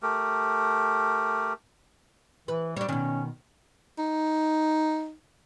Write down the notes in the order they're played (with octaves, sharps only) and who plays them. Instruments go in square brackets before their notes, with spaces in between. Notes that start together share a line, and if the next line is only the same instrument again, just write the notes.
[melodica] A3 G4 A#4
[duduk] E3 [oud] B4
[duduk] G3 [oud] D4 C#5
[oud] B2 D#3 [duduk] C#4
[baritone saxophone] D#4